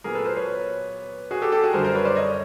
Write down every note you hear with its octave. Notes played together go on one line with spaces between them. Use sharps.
A#2 F#3 B3 G#4 A#4
A4 B4
A#4 C5
B4 C#5
F#4 G#4
G4 A4
G4 A4
F#4 G#4
F#2 D3 G3 A#4 C5
A#4 C5
B4 C#5
C5 D5
C#5 D#5